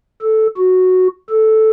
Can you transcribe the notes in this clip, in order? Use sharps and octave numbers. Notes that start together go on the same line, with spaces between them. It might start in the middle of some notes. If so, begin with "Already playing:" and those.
A4
F#4
A4